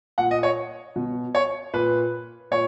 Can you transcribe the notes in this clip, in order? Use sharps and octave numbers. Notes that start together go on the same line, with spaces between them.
A#2 F#5
D#5
C#5
B2
C#5
A#2 B4
A#2 C#5